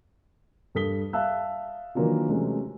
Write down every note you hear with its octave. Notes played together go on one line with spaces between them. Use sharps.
G2 A4 D#6 B6 G7
E5 F5 A5 E6 F#6
D#3 E3 F#3 A#3 D4 F4
C3 E3 F#3 G#3 A3 C#4